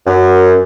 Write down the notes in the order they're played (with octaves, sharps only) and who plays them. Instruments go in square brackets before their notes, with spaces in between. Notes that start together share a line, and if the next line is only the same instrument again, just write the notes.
[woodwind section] F#2